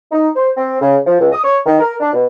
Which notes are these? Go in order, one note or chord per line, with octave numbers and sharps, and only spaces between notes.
D#4
C5
C4
C#3
F3
C#2
D#6
C#5
D#3
A#4
D4
B2